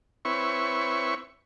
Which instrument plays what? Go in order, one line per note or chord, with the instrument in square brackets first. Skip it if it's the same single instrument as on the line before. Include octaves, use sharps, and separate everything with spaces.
[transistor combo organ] C4 E4 B4 C#5 C#6